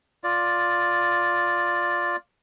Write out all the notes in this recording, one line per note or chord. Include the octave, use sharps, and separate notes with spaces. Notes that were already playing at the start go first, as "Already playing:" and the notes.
F4 D5